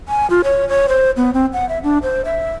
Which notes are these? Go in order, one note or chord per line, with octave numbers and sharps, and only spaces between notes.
G#5
F4
C#5
C#5
C5
B3
C4
F#5
E5
D4
C5
E5